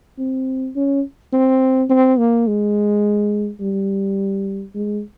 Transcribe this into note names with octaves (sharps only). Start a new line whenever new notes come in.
C4
C#4
C4
C4
A#3
G#3
G3
G#3